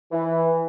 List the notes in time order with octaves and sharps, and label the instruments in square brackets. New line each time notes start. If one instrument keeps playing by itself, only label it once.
[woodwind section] E3